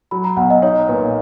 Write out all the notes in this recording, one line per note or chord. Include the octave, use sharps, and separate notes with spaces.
F#3 B5
A#5
B1 F#5
D#5
D#4 C#5
A#2 B4